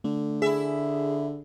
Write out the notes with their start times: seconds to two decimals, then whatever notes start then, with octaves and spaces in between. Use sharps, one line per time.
0.04 D3 A3
0.42 E4 G#4 E5